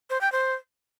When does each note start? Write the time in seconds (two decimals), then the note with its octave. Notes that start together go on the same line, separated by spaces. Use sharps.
0.10 C5
0.21 G5
0.32 C5